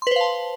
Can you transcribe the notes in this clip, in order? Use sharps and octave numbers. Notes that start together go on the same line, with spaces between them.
B4 C5 F5 A5 C6